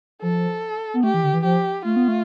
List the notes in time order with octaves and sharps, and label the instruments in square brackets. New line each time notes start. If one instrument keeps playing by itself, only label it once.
[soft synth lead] F3 [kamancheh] A4
[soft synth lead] B3
[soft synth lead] A3 [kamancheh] G4
[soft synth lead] E3
D3
E3
[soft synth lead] F3 [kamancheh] G4
[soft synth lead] A3 [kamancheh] F4
[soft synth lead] B3
A3